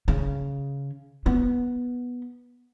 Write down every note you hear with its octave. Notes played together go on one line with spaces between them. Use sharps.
C#3
B3